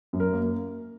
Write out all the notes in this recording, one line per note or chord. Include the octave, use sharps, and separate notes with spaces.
F#2
A#4
A#3